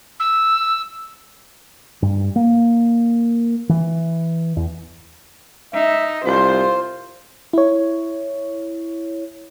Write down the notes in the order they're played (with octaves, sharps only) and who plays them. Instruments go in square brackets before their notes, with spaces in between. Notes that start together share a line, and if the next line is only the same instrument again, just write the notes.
[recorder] E6
[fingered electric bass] G2
A#3
E3
E2
[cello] D#4 [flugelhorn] E5
[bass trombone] C2 [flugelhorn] F4 [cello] C5
[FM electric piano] E4 C#5